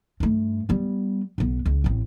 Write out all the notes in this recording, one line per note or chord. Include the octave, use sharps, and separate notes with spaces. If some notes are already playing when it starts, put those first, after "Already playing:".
G2 A3
G3 B3
B1 B3
C#2
A1 C4